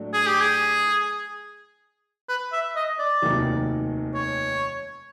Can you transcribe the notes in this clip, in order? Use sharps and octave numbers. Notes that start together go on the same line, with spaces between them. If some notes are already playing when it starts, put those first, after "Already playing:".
Already playing: A2 F#3 A3 D4
G#4
G4
G#4
B4
E5
D#5
D5
F1 D#2 D#3 F#3
C#5